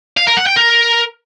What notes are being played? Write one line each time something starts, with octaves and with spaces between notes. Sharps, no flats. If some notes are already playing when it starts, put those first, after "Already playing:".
F5
A#4
F#5
G5
A#4